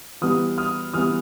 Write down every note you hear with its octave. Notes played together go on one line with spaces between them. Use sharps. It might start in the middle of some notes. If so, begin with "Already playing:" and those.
E3 G3 B3 D#6 F6
D#6 F6
E3 G3 B3 D#6 F6